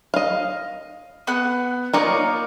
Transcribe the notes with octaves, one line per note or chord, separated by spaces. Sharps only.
D#5 F5
B3 F#5 F#6
A#3 D#4 F4 A#4 C#5 D5